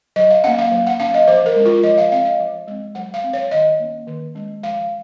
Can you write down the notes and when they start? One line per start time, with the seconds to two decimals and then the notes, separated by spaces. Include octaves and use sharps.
0.16 F#3 D#5
0.30 F5
0.44 A#3 C#4 F#5
0.59 F5
0.72 F#3
0.87 F#5
1.00 C#4 F5
1.14 D#5
1.28 F3 C5
1.46 A#4
1.56 G#3 C#4
1.66 F4
1.83 F3 D#5
1.98 F5
2.12 C4 F5
2.25 D#5
2.40 F3
2.68 G#3 C4
2.95 F#3 F#5
3.14 F5
3.24 C4
3.33 C#5
3.51 D#3 D#5
3.79 A#3 C#4
4.07 D#3
4.35 G#3 C#4
4.63 F3 F5